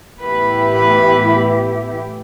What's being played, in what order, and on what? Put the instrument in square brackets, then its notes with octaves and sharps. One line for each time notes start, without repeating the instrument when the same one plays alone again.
[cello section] A2 E3 B3 E4 G4 [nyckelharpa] B4
[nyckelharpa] B4